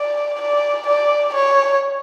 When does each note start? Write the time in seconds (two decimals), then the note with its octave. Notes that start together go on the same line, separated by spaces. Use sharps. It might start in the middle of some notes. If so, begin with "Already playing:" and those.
Already playing: D5
0.41 D5
0.87 D5
1.34 C#5